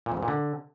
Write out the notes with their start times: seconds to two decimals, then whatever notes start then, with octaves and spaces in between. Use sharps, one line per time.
0.06 A#2
0.12 F2
0.17 G#2
0.23 A#2
0.28 D3